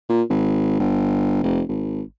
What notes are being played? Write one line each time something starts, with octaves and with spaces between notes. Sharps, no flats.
A#2
G#1
G1
F1
G#1